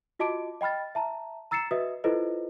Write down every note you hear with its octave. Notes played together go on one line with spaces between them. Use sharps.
F4 F#4 D#5 A5 D6 D7
D#5 G5 B5 F6 A6
E5 A5 A#5
A#5 E6 A6 C7 C#7 E7
F#4 B4 D#5 E5 D#6
E4 F4 A4 B4 C5 D#5